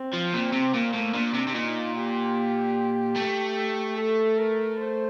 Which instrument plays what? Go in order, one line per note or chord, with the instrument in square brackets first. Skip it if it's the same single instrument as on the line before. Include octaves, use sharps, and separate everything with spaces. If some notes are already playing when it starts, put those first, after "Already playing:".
Already playing: [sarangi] C4
[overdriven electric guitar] F3
[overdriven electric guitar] A#2 [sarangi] C4
[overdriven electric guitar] C3
[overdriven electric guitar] A#2 [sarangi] A#3
[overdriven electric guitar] A2
[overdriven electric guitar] A#2 [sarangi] D4
[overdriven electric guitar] C3
C3
[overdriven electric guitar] A#2 [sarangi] D#4
[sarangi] G4
[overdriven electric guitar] A3
[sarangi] A4
A#4
C5